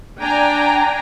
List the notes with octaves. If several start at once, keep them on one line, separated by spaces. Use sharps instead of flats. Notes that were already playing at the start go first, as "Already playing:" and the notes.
D4 G5 G#5 A#5